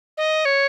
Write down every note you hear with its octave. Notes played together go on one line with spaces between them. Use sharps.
D#5
C#5